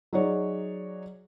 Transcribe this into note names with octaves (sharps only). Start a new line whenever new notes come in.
F#3 D#4 F#4 G#4 C#5 D5